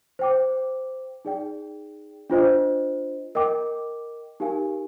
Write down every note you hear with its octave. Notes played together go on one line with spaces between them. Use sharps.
C5 G5 D6
D#4 G#4 D5 G5
D4 F4 C5 D#5
A#4 D#5 G5 D6
D#4 G4 A#4 F5 G#5